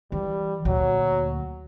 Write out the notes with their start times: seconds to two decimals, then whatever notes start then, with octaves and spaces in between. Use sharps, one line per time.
0.12 E3 G3
0.65 D2 A#2 F#3